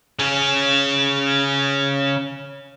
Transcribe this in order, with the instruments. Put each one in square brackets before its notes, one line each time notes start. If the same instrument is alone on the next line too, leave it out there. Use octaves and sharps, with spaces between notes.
[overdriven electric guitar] C#3 C#4